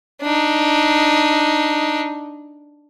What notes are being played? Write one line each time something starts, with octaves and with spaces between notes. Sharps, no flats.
D4 D#4